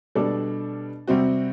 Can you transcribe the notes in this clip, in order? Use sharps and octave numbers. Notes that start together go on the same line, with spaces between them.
B2 G3 D4 A4
C3 G3 C4 F#4